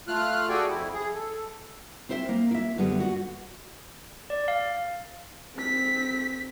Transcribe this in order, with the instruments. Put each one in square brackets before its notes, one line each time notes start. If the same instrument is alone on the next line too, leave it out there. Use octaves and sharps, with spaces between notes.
[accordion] A3 F4 F6 F#6
F#4 G#4 A4 D5 G5 G#5
F2 E4
G#4
A4
[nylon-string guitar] C4 E4 C5 C#5 E5
A#3
E4 E5
F#2 D3 G3 B3
F#4
[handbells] D5
F5
[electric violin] C4 B6